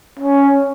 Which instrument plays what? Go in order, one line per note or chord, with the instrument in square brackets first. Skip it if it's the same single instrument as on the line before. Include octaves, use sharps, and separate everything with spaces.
[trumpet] C#4